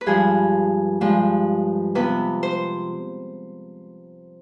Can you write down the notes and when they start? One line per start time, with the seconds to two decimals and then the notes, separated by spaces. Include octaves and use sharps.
0.01 B4
0.06 G2 F3 G#3 G#4
1.01 G2 F3 G#3
1.95 C3 F3 B3 B4
2.43 C5